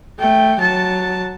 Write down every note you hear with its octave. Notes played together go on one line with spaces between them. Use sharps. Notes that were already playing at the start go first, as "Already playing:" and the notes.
A3 G5
F#3 A5